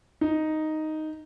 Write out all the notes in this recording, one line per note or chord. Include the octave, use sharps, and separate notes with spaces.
D#4